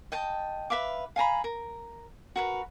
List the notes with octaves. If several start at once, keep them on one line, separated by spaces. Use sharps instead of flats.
D#5 G5 A5
B4 E5 F5 D6
F5 G#5 A#5 B5
A#4
F#4 A#4 B4